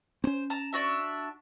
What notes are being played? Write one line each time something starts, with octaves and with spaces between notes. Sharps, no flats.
C4 C#4 C5
A5 A#5
D4 F#4 E5